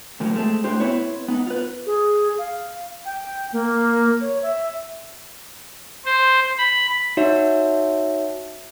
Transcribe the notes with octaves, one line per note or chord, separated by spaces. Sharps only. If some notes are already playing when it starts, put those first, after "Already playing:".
D2 A2 F#3 A#3
G#3 A3 C4
A2 D4 F#4 G4 C5
B3 C4 E4 B4 C#5
B3 D#4
F4 B4
G#4
F5
G5
A#3
C#5
E5
C5
B5
D#4 F#4 C#5 E5